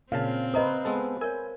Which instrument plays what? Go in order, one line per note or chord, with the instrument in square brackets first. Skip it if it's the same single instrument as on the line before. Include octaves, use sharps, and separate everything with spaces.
[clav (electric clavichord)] A#2 C#3 A5 [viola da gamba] C4 [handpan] F5
[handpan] B4 C5 [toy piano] D#5 A#5 D#6
[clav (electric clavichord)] G#3 B3 A4
[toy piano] A#4 C#5 [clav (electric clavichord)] G#5